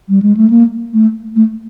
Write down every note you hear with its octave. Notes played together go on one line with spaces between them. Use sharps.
G3
G#3
A3
A#3
A3
A3